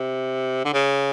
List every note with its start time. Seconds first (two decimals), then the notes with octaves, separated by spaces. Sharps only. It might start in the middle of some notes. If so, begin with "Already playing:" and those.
Already playing: C3
0.65 D3
0.73 C#3